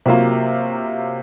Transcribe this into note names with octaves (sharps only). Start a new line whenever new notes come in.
C3 F#3 A#3 F4